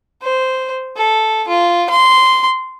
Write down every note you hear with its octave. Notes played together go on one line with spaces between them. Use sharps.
C5
A4
F4
C6